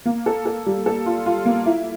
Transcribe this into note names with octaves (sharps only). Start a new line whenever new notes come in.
A#3
A4
A4
G3
A4
F4
F4
A#3
E4